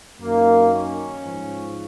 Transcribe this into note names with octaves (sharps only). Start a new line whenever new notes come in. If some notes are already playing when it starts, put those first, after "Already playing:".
F#2 D#3 A#3
C#4
G#2 F3